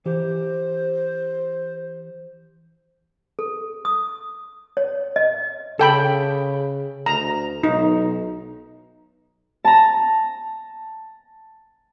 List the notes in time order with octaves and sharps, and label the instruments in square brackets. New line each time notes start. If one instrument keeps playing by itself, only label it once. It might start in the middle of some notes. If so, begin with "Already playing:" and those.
[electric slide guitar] E3 G4 [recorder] C5
[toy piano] A4
D#6
C#5
D#5
[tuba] C#3 [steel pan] A4 G5 B5
[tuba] D2 [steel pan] A#5
[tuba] B1 [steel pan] D#4
[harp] A5 A#5